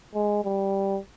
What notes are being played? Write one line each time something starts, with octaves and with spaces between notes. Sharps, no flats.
G#3
G3